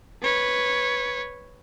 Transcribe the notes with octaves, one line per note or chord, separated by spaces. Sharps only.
B4 C#5